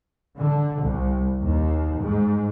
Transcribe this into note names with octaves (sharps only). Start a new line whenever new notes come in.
D3
C2
D#2
G#2